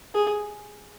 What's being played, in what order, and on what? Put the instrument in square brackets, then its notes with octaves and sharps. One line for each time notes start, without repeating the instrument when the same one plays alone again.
[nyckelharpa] G#4